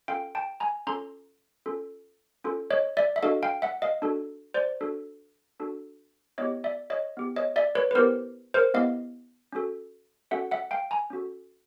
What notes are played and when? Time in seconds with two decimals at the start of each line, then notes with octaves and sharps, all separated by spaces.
0.08 C#4 F4 A4 F5 G5
0.35 G5 A5
0.60 G#5 A#5
0.87 C#4 F4 A4 A#5 C6
1.66 C#4 F4 A4
2.44 C#4 F4 A4
2.71 C#5 D#5
2.97 D5 E5
3.16 E5
3.23 D4 F#4 A4 D#5 F5
3.43 F5 G5
3.62 E5 F#5
3.82 D#5 F5
4.02 D4 F#4 A4
4.54 C5 D5
4.81 D4 F#4 A4
5.60 D4 F#4 A4
6.38 B3 E4 G4 C#5 D#5
6.64 D5 E5
6.90 C#5 D#5
7.17 B3 E4 G4
7.36 C#5 D#5
7.56 D5 E5
7.75 B4 C#5
7.91 B4
7.95 B3 E4 G4 A#4 C5
8.54 A#4 C5
8.74 B3 E4 G4 D#5 F5
9.52 C#4 F#4 A4
10.31 C#4 F#4 A4 E5 F#5
10.51 E5 F#5
10.71 F5 G5
10.91 G#5 A#5
11.10 C#4 F#4 A4